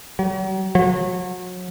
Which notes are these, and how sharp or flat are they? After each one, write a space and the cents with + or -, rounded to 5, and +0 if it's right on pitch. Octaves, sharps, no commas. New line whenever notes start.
F#3 +45
F#3 -30